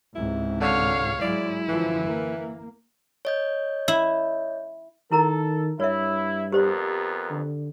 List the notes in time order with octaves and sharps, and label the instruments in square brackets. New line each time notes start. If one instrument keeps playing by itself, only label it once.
[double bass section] C#2 G#2 C3 [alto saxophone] E4
[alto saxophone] D3 [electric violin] C#5 F5
[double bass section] G#2 F#3 G#3 [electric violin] E4 [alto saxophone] D5
[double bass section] F#2 D3 F3 [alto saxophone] E3
[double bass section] A#3
[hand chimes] C#5 D#5 G6
[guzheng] E4
[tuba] D#3 [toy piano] E4 A#4 A#5 [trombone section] A4
[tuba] G2 [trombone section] E4 [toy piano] C#5 E5
[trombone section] F2 B3 A#4 [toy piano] G4 C5 D5
[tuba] D3